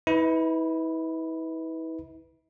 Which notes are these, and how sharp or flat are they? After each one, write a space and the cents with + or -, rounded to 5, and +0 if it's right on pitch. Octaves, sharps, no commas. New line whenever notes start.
E4 -40 B4 +0